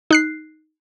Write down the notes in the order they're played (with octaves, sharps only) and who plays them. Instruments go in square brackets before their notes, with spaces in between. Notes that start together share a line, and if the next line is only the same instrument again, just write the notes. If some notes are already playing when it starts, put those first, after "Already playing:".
[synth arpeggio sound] D#4 F#6 C7